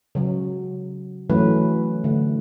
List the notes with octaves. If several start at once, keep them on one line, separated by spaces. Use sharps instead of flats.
C#3 F#3
E3 F#3 A3 C#4 B4
D3 A3